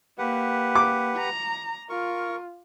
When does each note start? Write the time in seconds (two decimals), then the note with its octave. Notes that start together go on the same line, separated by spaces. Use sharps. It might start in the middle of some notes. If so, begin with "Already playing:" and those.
0.18 A#3 G4 B4 F#5
0.75 D6
1.17 A#5
1.90 F4 A#4 C#6